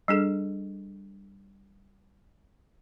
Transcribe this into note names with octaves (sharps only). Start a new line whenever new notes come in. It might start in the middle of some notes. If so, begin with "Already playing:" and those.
G3 D4 G#4 A4